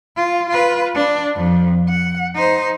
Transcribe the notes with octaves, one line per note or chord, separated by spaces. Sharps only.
F4
F4 B4
D4
F2
F#5
D#4 C5